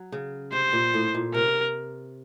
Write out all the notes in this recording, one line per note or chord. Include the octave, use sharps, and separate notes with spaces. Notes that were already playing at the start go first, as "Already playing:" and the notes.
Already playing: F#3
C#3
C3 C5
A#2
A2
A#2
C3 A#4